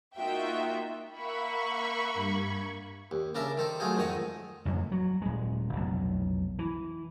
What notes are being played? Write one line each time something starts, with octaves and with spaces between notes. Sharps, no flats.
A#3 D#4 F4 F#4 E5 G5
A#3 E5 F#5 B5 C#6
G2 G#6
D#2
C#3 D4 A#4 D5 E5
D#3 A4 C5
F#3 A3 D#4 F4 G#4 C5
F2 G#2 D#3 D#4 D#5 C#6
A1 F2
F#3
D#1 G#3
F1 B1
E3